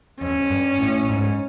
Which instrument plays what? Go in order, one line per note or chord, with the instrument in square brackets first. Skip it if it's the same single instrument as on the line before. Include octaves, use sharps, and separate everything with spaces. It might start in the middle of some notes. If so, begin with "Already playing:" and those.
[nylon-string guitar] F2 [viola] C#4
[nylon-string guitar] E2
F2
G2
A2
G#2